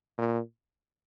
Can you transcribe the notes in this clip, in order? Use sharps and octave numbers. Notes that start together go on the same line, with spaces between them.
A#2